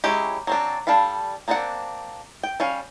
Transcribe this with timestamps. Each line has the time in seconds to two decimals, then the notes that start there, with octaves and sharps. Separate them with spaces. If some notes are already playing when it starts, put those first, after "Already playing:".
0.04 F#3 G#3 C#4 E4 G4
0.47 F#3 C4 D4
0.87 G3 D4 A4 F5 B5
1.48 A#3 C4 D4 D5 F#5
2.43 G5
2.60 G3 C#4 F5